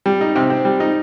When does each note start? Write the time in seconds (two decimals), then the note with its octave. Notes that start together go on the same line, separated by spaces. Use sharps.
0.06 G3
0.21 D#4
0.36 C3
0.50 C4
0.65 G3
0.80 D#4